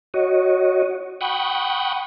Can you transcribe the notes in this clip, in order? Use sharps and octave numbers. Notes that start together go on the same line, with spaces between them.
F#4 C#5 D#5
F#5 G5 B5 C#6 D#6